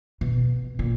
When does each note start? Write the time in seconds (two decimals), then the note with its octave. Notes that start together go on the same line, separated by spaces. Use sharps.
0.21 B2
0.79 A#2